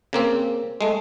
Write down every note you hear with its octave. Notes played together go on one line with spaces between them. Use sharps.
C#3 A#3 C4
G#3 A3